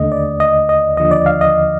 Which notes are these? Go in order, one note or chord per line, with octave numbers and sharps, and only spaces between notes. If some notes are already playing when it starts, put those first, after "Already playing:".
Already playing: D#2 D3 A3 D#5
D5
D#5
D#5
D#2 D3 F3 D#5
D5
F5
D#5